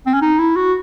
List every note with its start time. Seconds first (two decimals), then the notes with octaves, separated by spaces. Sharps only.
0.06 C4
0.14 C#4
0.22 D#4
0.39 E4
0.56 F#4